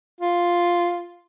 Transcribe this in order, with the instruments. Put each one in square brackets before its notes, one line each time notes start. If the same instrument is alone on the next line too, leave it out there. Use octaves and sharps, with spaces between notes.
[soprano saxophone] F4